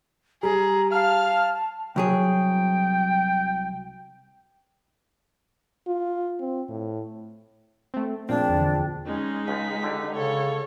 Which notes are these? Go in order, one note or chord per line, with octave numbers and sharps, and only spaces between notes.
G3 G#4 A#5
F5 A5 F6
C2 F#3 G#4 G5
F4
C4
A2
A3 C4
F2 A#2 C4 D4 F4 G#4 G5
E2 D3
G#3 C#4 D#4
C#2 B6
C#2 D3 G4
C#3 A4 C#5